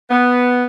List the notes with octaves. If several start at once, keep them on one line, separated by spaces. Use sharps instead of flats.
B3